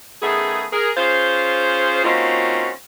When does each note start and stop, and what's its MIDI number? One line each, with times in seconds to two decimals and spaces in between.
0.22 0.64 51
0.22 0.64 57
0.22 0.64 59
0.22 0.64 61
0.22 0.64 68
0.73 0.90 68
0.73 0.90 70
0.97 2.01 61
0.97 2.01 65
0.97 2.01 68
0.97 2.01 72
2.05 2.70 58
2.05 2.70 60
2.05 2.70 61
2.05 2.70 63
2.05 2.70 65
2.05 2.70 66